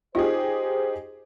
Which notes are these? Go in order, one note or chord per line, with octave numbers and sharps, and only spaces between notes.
D#4 F4 G4 G#4 C5